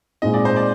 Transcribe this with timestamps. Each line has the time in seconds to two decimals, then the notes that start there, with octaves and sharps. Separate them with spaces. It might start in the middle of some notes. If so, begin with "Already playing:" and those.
0.22 A#2 G#3 C4 D#4 D#5
0.34 D5
0.45 C5
0.56 D5